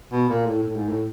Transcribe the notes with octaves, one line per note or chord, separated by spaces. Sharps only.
B2
A#2
A2
A2
G#2
A2